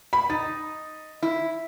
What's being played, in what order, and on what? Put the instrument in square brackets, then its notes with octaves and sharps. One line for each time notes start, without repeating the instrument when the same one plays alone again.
[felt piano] B5
[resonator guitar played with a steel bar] D#4 [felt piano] A6
[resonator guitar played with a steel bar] E4